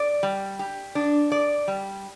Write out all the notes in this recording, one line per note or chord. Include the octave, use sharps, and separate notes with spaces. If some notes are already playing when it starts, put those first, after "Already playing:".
Already playing: D5
G3
G4
D4
D5
G3